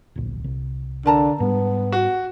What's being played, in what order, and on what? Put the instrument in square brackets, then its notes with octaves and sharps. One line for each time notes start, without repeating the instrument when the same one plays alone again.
[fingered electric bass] D1 A#1
C2
[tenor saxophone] D3 [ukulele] A#4 A5 A#5
[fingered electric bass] G#2 G3 [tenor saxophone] B3
[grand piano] F#4